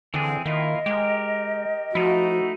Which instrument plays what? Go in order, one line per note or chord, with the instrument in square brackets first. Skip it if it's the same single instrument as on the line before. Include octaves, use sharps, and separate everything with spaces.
[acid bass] D3 [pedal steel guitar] E3 C4 G#4
[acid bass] D#3 [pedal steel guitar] A#3 E4 F4 [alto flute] D#5
[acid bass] G#3 [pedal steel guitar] G4 A#4
[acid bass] F3 [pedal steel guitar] A3 D#4 E4 [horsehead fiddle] F#4